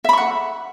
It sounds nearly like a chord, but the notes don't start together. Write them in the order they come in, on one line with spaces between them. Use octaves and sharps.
E5 B5 C#6 F#5